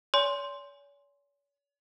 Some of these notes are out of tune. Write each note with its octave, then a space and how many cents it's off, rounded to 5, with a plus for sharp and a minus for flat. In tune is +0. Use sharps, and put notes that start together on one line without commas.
C#5 +40 G#5 +0 C6 +5